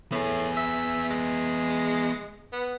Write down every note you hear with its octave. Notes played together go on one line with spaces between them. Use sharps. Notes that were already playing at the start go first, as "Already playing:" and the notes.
A2 B3 G#4
E5
G#3
B3